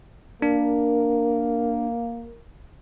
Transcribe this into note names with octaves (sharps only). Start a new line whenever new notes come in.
A#3 D4 A#4